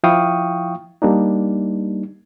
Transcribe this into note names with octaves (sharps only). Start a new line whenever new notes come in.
F3 E4 F5 G5 C#6 D#6
G3 A#3 D4 D#4